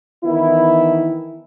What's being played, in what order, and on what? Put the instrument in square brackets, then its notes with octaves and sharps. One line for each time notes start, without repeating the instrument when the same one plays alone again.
[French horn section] D#3 E3 B3 E4